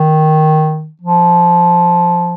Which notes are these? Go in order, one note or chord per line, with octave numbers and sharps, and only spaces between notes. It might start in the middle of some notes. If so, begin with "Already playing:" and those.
Already playing: D#3
F3